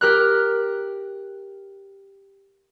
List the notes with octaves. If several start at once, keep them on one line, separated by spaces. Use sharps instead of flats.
G4 A#4 F6 F#6